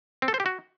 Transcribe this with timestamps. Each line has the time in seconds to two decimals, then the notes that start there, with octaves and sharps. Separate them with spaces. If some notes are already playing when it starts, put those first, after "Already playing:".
0.22 C4
0.28 A4
0.34 C5
0.40 G4
0.46 F#4